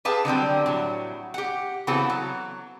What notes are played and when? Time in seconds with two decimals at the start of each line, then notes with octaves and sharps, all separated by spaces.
0.05 G4 G#4 B4 F5 A5
0.25 D3 F#3 G3 C4
0.66 A2 F#3
1.34 G4 F#5
1.87 C#3 E3 B3 C4 F#4 A4
2.09 F#3